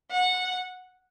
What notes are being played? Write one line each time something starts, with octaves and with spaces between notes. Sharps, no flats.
F#5